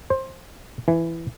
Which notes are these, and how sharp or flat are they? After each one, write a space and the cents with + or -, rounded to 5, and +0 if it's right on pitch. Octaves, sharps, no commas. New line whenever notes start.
C5 +20
E3 +10